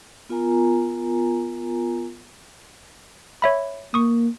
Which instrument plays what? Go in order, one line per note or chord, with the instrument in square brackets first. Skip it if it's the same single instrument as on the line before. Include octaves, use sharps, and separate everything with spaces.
[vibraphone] B3 F4 A#4 G#5 A#5
[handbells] C#5 E5 B5
[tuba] A#3 [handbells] C#6 D#6